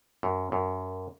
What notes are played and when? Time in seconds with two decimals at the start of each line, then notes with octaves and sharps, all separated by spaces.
0.23 F#2
0.52 F#2